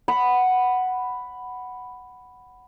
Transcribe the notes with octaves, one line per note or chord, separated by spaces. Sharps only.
F#5 B5